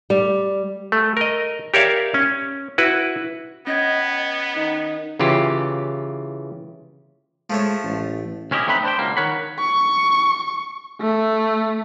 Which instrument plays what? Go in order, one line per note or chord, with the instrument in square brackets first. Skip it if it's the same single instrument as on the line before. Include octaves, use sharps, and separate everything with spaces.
[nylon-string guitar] G3
[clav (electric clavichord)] A3
A#4 D#5
G4 A#4 C#5 D5 E5 F5
C#4
E4 F#4 B4
[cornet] B3 [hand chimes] C#4 G#6 [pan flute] D#5
[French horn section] D#3 D#4
[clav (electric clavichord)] C#3 E3 F4 G4
[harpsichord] F3 A3 C#5 [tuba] G#3
[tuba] A1
[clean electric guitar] D2 C#4 E4 G4 D#5
A3 C4 D#4 B4 B5
D4 C5 G5
C#2 B2 G3 A#3
D#3 A#4 C#5 F#5 B5
[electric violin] C#6
A3